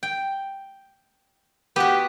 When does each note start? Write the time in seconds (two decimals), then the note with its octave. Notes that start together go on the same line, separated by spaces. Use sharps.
0.03 G5
1.76 B3 F#4 G4